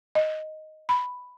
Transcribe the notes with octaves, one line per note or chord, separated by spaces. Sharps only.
D#5
B5